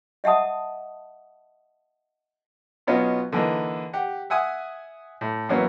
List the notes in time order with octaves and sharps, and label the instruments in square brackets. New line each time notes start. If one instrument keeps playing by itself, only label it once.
[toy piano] D#5 E5 F#5 A5 D#6
[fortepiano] B2 F#3 B3 C#4 D#4 F4
D3 E3 A#3 D#4
G4 F#5
E5 F#5 G#5 D#6
A2
F#2 E3 A#3 B3 C#4